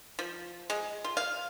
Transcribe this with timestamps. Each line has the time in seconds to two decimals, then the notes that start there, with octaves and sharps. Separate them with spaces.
0.19 F3
0.70 G#3
1.04 F4
1.17 F5